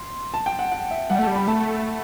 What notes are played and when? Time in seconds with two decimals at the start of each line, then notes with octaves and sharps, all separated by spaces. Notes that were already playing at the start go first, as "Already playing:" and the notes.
Already playing: C6
0.34 A5
0.46 G5
0.59 F#5
0.72 F#5
0.91 E5
1.10 G3 F#5
1.19 A3
1.23 G3 A5
1.35 B5
1.47 A3 A5